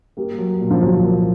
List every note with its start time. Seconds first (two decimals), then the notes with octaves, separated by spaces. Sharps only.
0.17 G3 A#3
0.38 F#3
0.60 A#2
0.71 F3
0.81 C2 F#3
1.03 A#3